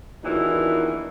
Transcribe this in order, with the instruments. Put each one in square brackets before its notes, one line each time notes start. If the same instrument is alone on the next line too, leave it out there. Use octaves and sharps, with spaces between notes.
[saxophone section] E2 A#2 D#3 E3 F#3 D4